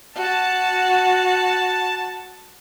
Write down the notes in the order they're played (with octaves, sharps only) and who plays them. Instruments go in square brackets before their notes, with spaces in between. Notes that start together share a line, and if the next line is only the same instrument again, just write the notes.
[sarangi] F#4 [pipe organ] A5